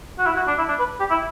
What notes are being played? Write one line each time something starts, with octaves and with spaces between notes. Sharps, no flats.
F#4
E4
F#4
D4
E4
D4
B4
G4
E4